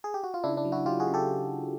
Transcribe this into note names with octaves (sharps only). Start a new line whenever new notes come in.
G#4
G4
F#4
F4
C#3 D4 E4
D4 E4
F#3
E4 F#4
F#3 F4 G4
F#4 G#4
C#3
G4 A4